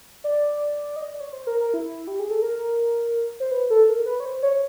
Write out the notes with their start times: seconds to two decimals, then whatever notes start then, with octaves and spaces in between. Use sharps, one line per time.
0.24 D5
0.96 D#5
1.08 D5
1.20 C#5
1.33 C5
1.47 A#4
1.60 A#4
1.74 E4
2.07 G4
2.19 G#4
2.30 A4
2.42 A#4
3.40 C5
3.52 B4
3.70 A4
3.89 A#4
4.06 B4
4.20 C#5
4.25 C5
4.43 C#5